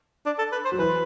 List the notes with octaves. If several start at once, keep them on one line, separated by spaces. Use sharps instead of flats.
D4
A4
B4
C5
F#3
E3 B4